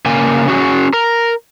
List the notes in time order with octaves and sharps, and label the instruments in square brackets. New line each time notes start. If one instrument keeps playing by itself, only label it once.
[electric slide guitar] C#3 A#3 G#5
C#4 F#4 G#4
A#4